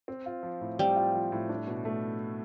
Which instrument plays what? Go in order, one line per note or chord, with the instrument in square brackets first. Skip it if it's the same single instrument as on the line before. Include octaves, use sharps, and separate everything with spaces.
[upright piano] C4
F4
F3
A2
[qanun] G3 [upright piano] C4
[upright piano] F4
F3
A2
D4
B2
A3